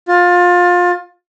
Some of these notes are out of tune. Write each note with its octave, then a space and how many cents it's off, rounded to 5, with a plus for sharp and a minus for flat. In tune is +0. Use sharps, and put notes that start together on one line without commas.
F4 +25